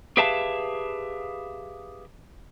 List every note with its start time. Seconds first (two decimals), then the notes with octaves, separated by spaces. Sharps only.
0.17 G4 G#4 B4 E5 F5 A5